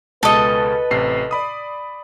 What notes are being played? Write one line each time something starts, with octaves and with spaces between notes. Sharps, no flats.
C#2 B2 G#3 A4 B4 D#5
A1 C3 C7
D5 B5 D#6